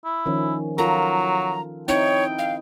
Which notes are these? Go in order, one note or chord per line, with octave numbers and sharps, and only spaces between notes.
E4
D#3 F3 C#4
F#3 F4 A4 A#4 A#5
C4 D#4 E4 C#5 G5
F5